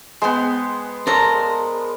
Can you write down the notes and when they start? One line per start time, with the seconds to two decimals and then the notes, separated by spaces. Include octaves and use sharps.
0.22 G#3 B3 C5 G5 C6
1.07 A4 A#4 C5 F5 A#5